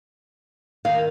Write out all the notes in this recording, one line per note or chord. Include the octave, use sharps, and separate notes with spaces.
D#3 F5